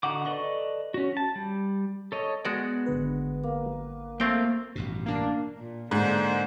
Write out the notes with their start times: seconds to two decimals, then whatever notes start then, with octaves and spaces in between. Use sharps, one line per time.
0.03 D3 D#4 F#4 F#5 D6
0.25 A4 B4 D5 D#5 C#6
0.94 C#4 F#4
1.17 A5
1.35 G3
2.12 A4 C#5 D#5
2.45 G#3 B3 F#4 D5
2.86 G#1 D3 B4
3.43 A#3
4.20 A3 A#3 C4 E5 F5 G5
4.75 A1 G2 B2
5.06 A#3 D4
5.57 A#2
5.91 G#2 D3 A#3 C5